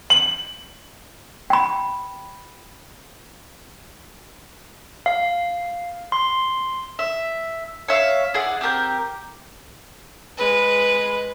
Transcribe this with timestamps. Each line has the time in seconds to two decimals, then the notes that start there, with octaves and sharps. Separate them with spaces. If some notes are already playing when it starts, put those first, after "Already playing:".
0.10 F#7
1.50 G5 B5
5.06 F5
6.12 C6
6.99 E5
7.88 C#5 E5 F5
8.34 E4 G#4 D5 F#5
8.61 C4 G4 A#4 G6
10.37 G#3 B4